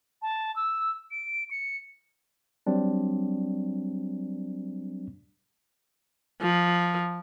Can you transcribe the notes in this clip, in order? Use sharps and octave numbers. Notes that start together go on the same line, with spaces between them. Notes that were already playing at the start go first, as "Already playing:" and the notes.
A5
E6
D7
C#7
F#3 G3 C4 D4
F3